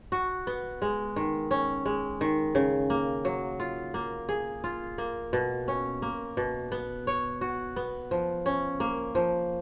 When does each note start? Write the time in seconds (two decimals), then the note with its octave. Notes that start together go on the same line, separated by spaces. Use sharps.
0.12 F#4
0.47 B3
0.82 G#3
1.16 D#3
1.51 C#4
1.86 G#3
2.21 D#3
2.55 C#3
2.90 A#3
3.25 F#3
3.60 F4
3.94 A#3
4.29 G#4
4.64 F4
4.98 A#3
5.33 B2
5.68 C#4
6.02 A#3
6.37 B2
6.72 B3
7.07 C#5
7.41 F#4
7.76 B3
8.11 F3
8.46 C#4
8.80 A#3
9.15 F3